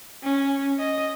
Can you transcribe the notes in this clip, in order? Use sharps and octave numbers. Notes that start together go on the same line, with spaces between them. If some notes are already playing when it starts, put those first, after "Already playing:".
C#4
D#5